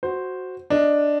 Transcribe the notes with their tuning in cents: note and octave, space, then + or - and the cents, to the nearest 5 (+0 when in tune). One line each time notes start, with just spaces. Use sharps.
F#4 +0 C5 +0
D4 +0 D#5 +0